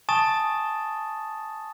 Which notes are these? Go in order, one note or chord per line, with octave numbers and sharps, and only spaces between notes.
G#5 A5 C#6 D#6 A6 E7